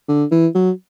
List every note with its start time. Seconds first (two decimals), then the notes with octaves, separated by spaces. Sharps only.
0.08 D3
0.31 E3
0.55 F#3